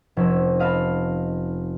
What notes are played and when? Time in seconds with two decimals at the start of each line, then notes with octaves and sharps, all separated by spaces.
0.17 F1 C#4 D#4 E6
0.59 D#5 F5 A5 B5